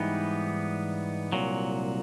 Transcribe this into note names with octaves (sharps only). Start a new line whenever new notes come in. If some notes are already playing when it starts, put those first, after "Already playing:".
Already playing: G#2 E3 G3 B3 D#4
C2 A#2 F#3